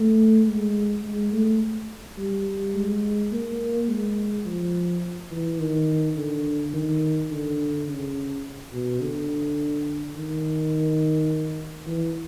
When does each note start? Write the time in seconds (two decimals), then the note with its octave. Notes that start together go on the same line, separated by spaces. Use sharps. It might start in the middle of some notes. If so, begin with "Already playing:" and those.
Already playing: A3
0.47 G#3
1.04 G#3
1.33 A3
2.18 G3
2.75 G#3
3.32 A#3
3.89 G#3
4.46 F3
5.31 E3
5.60 D#3
6.16 D3
6.74 D#3
7.31 D3
7.88 C#3
8.73 B2
9.02 D3
10.16 D#3
11.86 E3